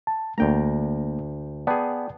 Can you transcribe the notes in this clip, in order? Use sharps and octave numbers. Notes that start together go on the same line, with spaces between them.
A5
D2 A3 A#3 D4 G5 A#5
B3 G#4 D5 G5 A5